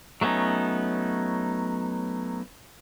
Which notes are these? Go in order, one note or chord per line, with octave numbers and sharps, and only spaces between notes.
F#3 A3 B3 C#4 D#4